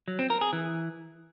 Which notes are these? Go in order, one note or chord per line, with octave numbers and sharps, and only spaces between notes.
F#3
C4
A#4
G#4
E3